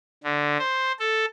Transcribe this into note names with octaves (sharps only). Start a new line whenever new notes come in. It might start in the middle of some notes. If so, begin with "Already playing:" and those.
D3
C5
A4